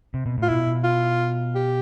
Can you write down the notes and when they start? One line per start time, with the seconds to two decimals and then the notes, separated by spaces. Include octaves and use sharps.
0.14 C3
0.26 B2
0.38 A2 F4
0.49 B2 E4
0.84 F4
1.55 G4